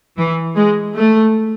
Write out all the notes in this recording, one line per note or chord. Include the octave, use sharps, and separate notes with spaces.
E3
G#3
A3